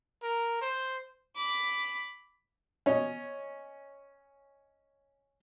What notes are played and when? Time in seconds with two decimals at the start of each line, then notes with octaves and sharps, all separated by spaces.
0.22 A#4
0.61 C5
1.36 B5 D6
2.86 C#4 C#5 D#5